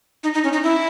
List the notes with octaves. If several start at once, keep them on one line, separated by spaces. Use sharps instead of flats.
D#4
D#4
C#4
D#4
E4